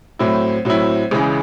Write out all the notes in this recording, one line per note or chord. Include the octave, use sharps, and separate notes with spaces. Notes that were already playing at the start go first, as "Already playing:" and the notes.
A2 F#3 C4 E4
A2 F#3 C4 E4
C#2 C#3 E3 G#3